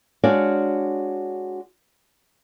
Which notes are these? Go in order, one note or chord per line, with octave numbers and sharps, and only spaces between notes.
G#3 D4 F#4 C#5 D5 F5